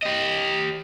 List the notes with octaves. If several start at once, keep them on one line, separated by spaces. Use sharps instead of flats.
G4 D#5